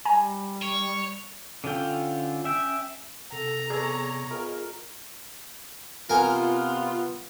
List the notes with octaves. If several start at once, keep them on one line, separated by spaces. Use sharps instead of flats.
G3 G#5 A#5
C#5
D3 C#4 F4 G5
C#4 E5 G5
C3 A4 A#5
B3 G#4 A4 C#5 D5
F4 G#4 A#4 D#5
C3 B3 F4 A#4 G#5